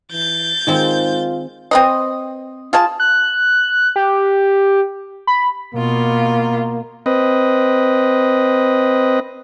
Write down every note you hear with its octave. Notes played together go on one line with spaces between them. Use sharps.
E3 G6 A6
G#2 D#3 G#3 C4 F4
C4 B4 D#5
F4 G#4 A5
F#6
G4
B5
B2 A#3 F4
C4 B4 D#5